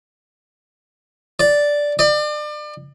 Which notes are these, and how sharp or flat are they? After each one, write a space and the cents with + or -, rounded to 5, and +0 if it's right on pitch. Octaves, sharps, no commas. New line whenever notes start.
D5 -5
D5 +35